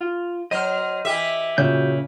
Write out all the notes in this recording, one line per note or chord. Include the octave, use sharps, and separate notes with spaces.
F4
F#3 C5 D#5 F6
E3 G4 E5
A#2 C#3 F#4 E6 G6